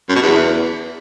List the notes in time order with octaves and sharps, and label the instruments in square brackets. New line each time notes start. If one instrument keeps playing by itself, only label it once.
[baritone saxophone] F#2
B2
E2